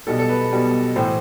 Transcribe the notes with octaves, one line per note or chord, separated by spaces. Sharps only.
B1 B2 G3 A4
A4
B4
B1 B2 G3
A2 E3 C5